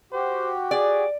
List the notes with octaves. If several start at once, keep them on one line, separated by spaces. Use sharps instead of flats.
F#4 G4 C5
G#4 D5